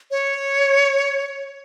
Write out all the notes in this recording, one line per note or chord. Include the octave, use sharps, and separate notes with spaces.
C#5